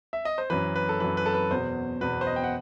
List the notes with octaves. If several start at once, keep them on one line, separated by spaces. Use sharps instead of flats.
E5
D#5
C5
F#2 E3 B4
B4
A4
F#2 E3 B4
B4
A4
B4
E2 B2 C5
E2 B2 B4
C5
D#5
G5
F#5